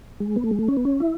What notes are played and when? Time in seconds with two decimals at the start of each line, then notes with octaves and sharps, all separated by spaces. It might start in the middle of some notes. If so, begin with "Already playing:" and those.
0.20 G#3
0.36 B3
0.44 A3
0.51 G#3
0.59 A3
0.68 C#4
0.77 B3
0.85 C#4
1.00 E4